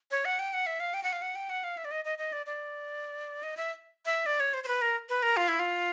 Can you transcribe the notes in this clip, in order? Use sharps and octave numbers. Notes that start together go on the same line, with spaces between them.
C#5
F#5
G5
F#5
E5
F5
G5
F#5
F5
F#5
G5
F#5
F5
E5
D5
D#5
D#5
D#5
D5
D5
D#5
E5
E5
D5
C#5
C5
C5
B4
A#4
B4
A#4
F4
E4
F4